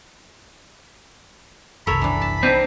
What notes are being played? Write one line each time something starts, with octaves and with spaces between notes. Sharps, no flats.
F#1 C2 A4 A#4 C#5 B5
E3 D4
A5
C4 D4 D#4